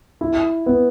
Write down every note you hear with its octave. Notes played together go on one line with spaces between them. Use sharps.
E4
B3